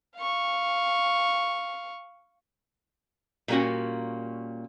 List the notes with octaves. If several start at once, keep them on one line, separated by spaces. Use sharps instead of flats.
F5 C#6
A#2 G3 A#3 C#4 F#4